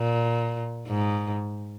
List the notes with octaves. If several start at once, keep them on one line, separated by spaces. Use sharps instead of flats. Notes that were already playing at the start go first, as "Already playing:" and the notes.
Already playing: A#2
G#2